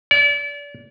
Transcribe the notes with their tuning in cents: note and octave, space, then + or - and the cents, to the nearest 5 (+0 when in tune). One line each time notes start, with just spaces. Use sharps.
D5 -35